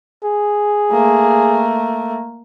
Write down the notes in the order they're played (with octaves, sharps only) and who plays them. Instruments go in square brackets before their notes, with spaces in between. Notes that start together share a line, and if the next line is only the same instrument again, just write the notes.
[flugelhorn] G#4
[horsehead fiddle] A3 A#3